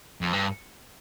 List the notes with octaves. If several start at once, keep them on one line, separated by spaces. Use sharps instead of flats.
F2
G2